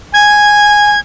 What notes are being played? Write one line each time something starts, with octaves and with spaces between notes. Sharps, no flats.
G#5 G#6